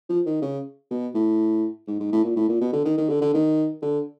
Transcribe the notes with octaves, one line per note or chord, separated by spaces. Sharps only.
F3
D#3
C#3
B2
A2
G#2
G#2
A2
A#2
A2
A#2
B2
D3
D#3
D#3
D3
D3
D#3
D3